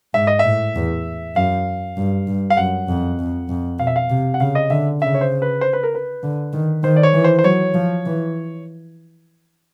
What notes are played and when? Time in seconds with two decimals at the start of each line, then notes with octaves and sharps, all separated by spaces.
0.14 G#2 E5
0.27 D#5
0.39 E5
0.45 A2
0.76 E2
1.36 F#2 F5
1.97 G2
2.28 G2
2.50 F5
2.57 F#2 F#5
2.88 F2
3.19 F2
3.49 F2
3.79 B2 F5
3.87 E5
3.96 F5
4.10 C3
4.34 F#5
4.40 C#3 F5
4.55 D#5
4.70 D3 E5
5.01 C#3 E5
5.14 C#5
5.21 C5
5.42 B4
5.61 C5
5.73 B4
5.83 A#4
5.95 B4
6.23 D3
6.53 D#3
6.83 D#3 C5
6.96 D5
7.03 C#5
7.14 E3
7.24 C5
7.39 C5
7.44 F#3 C#5
7.74 F3
8.06 E3